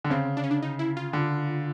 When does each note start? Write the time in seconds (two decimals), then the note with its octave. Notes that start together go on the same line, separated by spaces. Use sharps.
0.04 D3
0.10 C#3 C4
0.37 D4
0.44 C#4
0.51 D4
0.62 D#4
0.79 E4
0.97 F4
1.13 D3